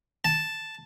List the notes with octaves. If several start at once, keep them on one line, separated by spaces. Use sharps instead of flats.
A5